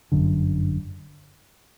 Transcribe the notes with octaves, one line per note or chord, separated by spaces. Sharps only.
G1 F#2 D3